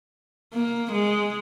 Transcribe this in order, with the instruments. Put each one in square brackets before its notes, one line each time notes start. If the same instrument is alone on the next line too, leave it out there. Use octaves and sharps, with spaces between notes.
[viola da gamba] A#3
G#3